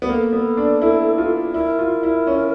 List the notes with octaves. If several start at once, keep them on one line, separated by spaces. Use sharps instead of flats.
B3
A#3 A4
B3
D4
E4
F4
E4 A#4
F4
E4
C#4